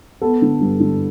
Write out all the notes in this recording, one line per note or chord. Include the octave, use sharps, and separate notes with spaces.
B3 A4
D3
G2
D3